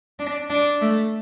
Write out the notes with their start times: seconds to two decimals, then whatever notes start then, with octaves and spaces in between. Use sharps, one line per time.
0.19 D4
0.50 D4
0.81 A3